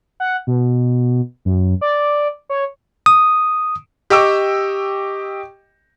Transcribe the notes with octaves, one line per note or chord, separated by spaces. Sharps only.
F#5
B2
F#2
D5
C#5
D#6
G4 D#5 G5 C#6 D6 E6